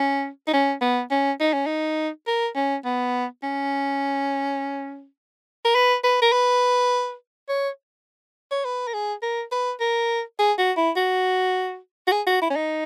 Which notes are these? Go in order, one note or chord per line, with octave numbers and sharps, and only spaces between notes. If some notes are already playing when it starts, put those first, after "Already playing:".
Already playing: C#4
D#4
C#4
B3
C#4
D#4
C#4
D#4
A#4
C#4
B3
C#4
A#4
B4
B4
A#4
B4
C#5
C#5
B4
A#4
G#4
A#4
B4
A#4
G#4
F#4
E4
F#4
F#4
G#4
F#4
E4
C#4
D#4